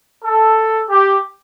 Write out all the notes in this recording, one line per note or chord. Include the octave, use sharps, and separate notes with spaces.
A4
G4